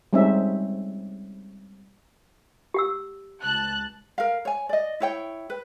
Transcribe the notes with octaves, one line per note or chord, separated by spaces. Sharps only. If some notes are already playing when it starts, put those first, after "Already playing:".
G3 G#3 C4 C#4 D#4 E5
G4 F#5 E6
C#2 A5 F#6
A#4 F5
C#5 G#5
D5 D#5
E4 C#5 G5
B4